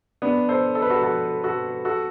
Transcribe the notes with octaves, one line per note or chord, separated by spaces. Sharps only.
B3 D4
A4 C5
A4
B4
F#4 A4
F#4 A4
F#4 A4
F#4 A4